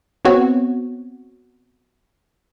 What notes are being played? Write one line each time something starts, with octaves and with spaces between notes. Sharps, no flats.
B3 C4 F#4 C#5